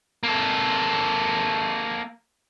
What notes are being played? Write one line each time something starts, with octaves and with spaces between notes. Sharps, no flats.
A#3 A4